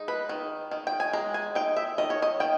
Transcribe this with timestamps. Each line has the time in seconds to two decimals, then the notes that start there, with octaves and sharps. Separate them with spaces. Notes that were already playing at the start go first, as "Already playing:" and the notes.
Already playing: G#3 D#4
0.08 B4
0.29 D#3
0.71 D#3
0.87 G5
1.00 G#5
1.13 G#3 A#5
1.34 G#5
1.55 D#4 G5
1.76 E5
1.98 D#3 D#5
2.10 C#5
2.22 D#5
2.40 D#3 G5